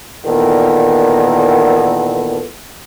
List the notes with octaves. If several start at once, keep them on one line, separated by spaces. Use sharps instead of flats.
E2 A#2 D#3 B3 A4